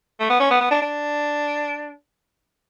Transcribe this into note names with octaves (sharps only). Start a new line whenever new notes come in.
A3
B3
C#4
B3
B3
D4
D4